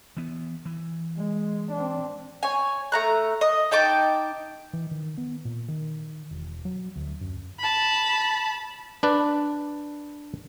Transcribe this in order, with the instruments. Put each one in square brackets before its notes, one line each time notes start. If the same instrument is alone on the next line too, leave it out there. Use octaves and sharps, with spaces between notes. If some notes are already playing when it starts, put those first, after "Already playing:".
[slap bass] E3 B3
E3
[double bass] G#3
C4 D4
[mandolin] C#5 G#5
A3 A#5 F#6
D#5
D#4 G5 A5 D6
[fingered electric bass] E3
D#3
B3
A#2
D#3
E1
F#3
D2
F#2
[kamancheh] A5 B5
[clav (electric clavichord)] D4 B4 D5